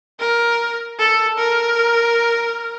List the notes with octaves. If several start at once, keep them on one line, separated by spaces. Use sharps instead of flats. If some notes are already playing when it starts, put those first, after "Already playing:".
A#4
A4
A#4